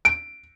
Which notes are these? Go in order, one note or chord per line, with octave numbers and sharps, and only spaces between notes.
D7